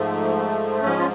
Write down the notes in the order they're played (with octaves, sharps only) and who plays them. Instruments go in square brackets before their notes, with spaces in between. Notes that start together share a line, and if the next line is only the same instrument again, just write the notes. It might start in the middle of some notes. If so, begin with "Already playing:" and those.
Already playing: [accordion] G#2 F3 A3
G#2 F3 C#4
F4